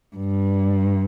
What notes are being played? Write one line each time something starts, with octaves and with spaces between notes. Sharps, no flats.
G2